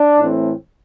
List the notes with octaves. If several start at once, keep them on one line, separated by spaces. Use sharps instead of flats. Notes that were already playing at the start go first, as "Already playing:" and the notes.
Already playing: D4
A2 E3 A3 C4